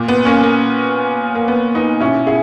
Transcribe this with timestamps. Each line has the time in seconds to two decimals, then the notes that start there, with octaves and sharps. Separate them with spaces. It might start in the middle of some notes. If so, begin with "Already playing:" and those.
Already playing: A#2
0.08 B3
0.25 A#3 C#4
0.43 A#3
1.35 A#3
1.48 B3
1.74 B3 D#4
2.00 B2 C#4 E4
2.27 E4 G#4